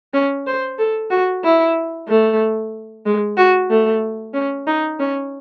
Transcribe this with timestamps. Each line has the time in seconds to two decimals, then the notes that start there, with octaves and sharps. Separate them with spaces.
0.14 C#4
0.47 C5
0.78 A4
1.10 F#4
1.44 E4
2.08 A3
3.06 G#3
3.37 F#4
3.70 A3
4.34 C#4
4.67 D#4
4.99 C#4